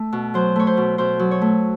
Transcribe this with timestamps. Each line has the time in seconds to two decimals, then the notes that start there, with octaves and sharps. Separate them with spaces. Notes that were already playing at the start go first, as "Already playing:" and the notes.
Already playing: A3
0.12 B2
0.34 F#3 C5
0.56 A3 C#5
0.67 C5
0.77 B2
0.98 B2 C5
1.19 F#3
1.31 C#5
1.41 A3